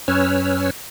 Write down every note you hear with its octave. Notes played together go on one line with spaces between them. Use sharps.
F#2 C#4 B4 C#5 E6 F6